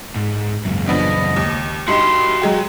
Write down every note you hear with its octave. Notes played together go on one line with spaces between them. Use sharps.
G#2
C#2 F#2
F3 B3 D4 D#5
D#2
G2 D#4 F#4 G5 C6 C#7
F#3 G#3 G4